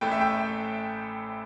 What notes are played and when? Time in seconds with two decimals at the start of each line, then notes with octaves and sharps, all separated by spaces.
0.01 A1 A2 A3 G5
0.12 E5
0.21 G5